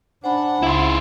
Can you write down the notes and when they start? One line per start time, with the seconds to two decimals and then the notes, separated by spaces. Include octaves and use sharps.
0.24 D4 C5 F#5 G#5 B5
0.63 C#2 E4 F4